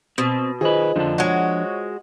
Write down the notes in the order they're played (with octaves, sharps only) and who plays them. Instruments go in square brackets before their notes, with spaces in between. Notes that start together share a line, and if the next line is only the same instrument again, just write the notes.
[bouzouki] B2 [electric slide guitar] C4
[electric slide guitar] D#3 B4 [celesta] F4 C5 D#5 [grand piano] G#4
[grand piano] F2 D3 [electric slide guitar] F3 D4
[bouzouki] G#3 F#4 [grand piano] C#5